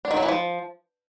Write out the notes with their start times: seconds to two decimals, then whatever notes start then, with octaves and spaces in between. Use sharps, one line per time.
0.05 D4
0.11 D#3
0.17 F#3
0.23 E3
0.28 F3